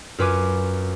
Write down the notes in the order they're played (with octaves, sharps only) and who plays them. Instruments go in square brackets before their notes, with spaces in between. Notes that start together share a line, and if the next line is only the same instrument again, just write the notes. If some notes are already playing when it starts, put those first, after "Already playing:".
[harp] F#2 F4 B4 G#5 D6